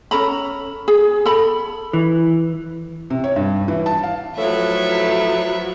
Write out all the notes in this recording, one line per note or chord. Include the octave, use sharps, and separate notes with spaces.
C#4 A4 A#5 B5
G#4
A4 B5
E3
C3
C#5
G2
E3
A5
F5
A2 F3 F#3 A3 B4 E5